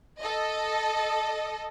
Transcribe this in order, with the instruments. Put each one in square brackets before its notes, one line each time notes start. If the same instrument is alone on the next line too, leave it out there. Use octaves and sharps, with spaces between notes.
[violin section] A4 D#5